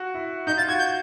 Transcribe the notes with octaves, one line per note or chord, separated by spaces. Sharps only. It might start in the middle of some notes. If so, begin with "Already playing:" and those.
Already playing: F#4
E4
D#4 G6
F4 A6
F#4 G#6
G6